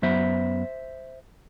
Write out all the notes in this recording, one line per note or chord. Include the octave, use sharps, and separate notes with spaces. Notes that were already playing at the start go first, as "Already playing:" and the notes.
F#2 F#3 B3 C5 E5